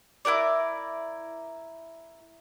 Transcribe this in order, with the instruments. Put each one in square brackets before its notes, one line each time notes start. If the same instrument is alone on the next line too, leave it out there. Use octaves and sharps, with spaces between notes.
[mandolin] E4 F#4 A#4 D5